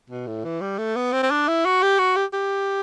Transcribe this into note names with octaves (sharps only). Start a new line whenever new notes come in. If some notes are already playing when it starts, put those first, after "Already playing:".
B2
A2
E3
G3
A3
B3
C4
C4
D4
E4
F#4
G4
F#4
G4
G4